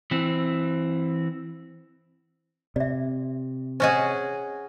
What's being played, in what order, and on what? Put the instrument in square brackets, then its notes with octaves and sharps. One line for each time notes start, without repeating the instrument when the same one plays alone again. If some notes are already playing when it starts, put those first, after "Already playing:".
[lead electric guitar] E3 C4
[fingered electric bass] C3 [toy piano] D5 E5
[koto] C#4 F#4 G#4 [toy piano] C5 D#5